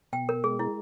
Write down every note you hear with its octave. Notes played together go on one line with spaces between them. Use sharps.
B2 G5
A#4
G#3 G#4
E4